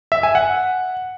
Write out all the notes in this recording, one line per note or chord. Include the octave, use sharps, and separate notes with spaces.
E5
G#5
F#5